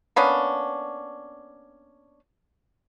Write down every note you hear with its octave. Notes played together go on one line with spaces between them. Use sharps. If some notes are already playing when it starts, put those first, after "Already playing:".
A#3 B3 C#4 D4